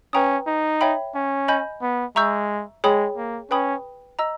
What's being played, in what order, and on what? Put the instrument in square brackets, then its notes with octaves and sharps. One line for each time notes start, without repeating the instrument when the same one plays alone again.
[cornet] C#4 [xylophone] B4 G5 A#5 D#6
[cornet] D#4
[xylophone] C#5 E5 G5 B5
[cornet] C#4
[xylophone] D#5 G#5 B5 G6
[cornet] B3
[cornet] G#3 [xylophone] E5 A#5 C#6 E6 G6
[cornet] G#3 [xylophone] G#4 C#5 G5 B5 D#6
[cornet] A#3
[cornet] C#4 [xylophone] B4 G5 B5 D#6
[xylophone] D#5 A#5 E6